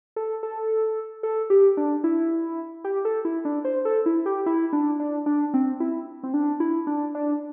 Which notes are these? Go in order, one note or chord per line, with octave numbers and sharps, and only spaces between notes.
A4
A4
A4
G4
D4
E4
G4
A4
E4
D4
C5
A4
E4
G4
E4
D4
D4
D4
C4
E4
C4
D4
E4
D4
D4